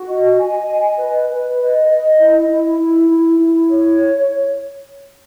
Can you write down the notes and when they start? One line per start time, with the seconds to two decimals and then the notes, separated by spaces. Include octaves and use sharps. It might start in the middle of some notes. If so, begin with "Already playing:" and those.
Already playing: F#4
0.08 D#5
0.38 G#5
0.68 D#5
0.98 B4
1.29 B4
1.58 D#5
1.88 D#5
2.18 E4
2.49 E4
2.79 E4
3.09 E4
3.39 E4
3.69 C#5